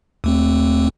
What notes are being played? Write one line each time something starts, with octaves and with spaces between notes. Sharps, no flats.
D#2 A3 C4